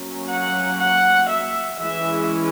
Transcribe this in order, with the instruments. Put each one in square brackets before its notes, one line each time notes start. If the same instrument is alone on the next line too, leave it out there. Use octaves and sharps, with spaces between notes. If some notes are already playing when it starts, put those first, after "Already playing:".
Already playing: [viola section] F#3 A#3 C#4
F#5
F#5
E5
E3 G#3 C#4 E5